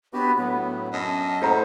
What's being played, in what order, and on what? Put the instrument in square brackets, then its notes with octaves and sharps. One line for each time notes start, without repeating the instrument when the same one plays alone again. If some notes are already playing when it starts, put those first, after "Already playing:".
[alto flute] B3 [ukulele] D4 C#5 [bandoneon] F#4 G4 B4
[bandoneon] A2 F#3 [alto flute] B3
[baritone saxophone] F#2 [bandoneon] D#5 [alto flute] A5
[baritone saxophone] A2 [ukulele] C5 F#5 A#5